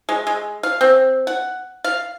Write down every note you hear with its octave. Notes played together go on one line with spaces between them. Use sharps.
G#3
G#3
F5
C4
F#5
F5